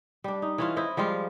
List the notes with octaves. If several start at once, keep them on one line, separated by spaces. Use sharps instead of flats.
G3 D4
D#4
E3 C#4 F4
E4 C5 D#5
F3 G3 G#3 F4